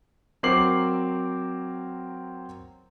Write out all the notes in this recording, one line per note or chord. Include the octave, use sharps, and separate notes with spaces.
F#3 C4 A#4 D6 C7 F#7